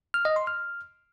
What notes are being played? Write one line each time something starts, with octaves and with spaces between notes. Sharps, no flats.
F6
D#5
C6
F6